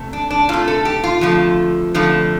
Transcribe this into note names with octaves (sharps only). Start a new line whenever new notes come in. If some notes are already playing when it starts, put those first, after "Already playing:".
Already playing: C3 A3
D4
D4
C3 A3 F4
A4
G4
F4
F2 D3 F3 A3
F2 D3 F3 A3